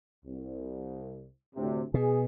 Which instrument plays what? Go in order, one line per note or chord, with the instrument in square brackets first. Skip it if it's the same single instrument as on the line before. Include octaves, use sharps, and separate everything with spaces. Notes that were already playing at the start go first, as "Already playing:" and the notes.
[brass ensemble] C2
D2 A2 C3
[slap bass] B2 [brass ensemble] G#4